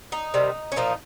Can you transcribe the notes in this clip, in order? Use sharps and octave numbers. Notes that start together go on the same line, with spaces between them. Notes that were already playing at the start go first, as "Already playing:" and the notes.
D#4
C3 D#3 G3
C#4
A#2 F3 A#3 D#4